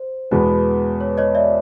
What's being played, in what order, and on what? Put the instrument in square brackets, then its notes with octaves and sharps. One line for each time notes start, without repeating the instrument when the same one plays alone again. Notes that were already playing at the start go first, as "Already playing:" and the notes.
Already playing: [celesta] C5
[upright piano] E2 B2 G#3 B3 [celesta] B4
[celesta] C#5
C#5 D#5
D5 E5